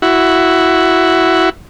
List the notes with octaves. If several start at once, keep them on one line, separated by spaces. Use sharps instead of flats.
E4 F#4